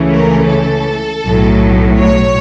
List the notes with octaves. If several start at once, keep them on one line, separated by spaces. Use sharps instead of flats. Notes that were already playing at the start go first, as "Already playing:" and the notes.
Already playing: C#2 C#3 E3 A3 C#4
A#4
A4
B1 A2 F#3
C#5